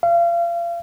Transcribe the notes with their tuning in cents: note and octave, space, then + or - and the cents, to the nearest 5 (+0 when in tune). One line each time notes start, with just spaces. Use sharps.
F5 -35